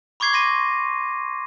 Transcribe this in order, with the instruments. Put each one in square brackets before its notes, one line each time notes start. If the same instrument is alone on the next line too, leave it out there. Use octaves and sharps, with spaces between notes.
[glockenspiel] B5 C#6 D6 G#6 C7
C6 A#6 D#7